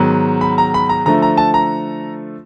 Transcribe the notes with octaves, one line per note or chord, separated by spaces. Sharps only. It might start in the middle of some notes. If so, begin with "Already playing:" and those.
Already playing: G#2 D#3 F#3 B3
B5
A#5
B5
A#5
D3 F3 A3 A#5
A#5
A5
A#5